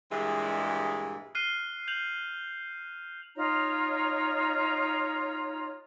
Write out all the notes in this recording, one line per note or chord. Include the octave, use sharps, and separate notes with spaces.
G2 A#2 E3 G3 G#3
F6 F#6 C7 D#7 G7
G6 F7 F#7
D#4 F4 C#5 A#5